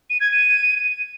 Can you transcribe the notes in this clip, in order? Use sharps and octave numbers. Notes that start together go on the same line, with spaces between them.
D#7
G#6
D#7